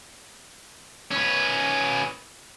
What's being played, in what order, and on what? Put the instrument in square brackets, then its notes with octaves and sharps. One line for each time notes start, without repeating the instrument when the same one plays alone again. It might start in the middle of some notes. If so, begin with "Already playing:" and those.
[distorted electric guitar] C#4 B4